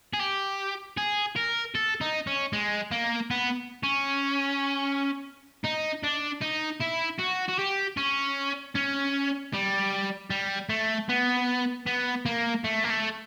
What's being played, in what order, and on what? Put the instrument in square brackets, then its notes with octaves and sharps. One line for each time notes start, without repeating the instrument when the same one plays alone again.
[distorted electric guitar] G#4
G4
G#4
A#4
A4
D#4
C#4
G#3
A#3
B3
C#4
D#4
D4
D#4
E4
F#4
F#4
G4
C#4
C#4
G3
G3
A3
B3
B3
A#3
A3
A#3
A3